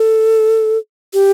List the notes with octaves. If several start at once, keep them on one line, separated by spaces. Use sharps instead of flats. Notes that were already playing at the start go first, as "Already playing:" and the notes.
Already playing: A4
G4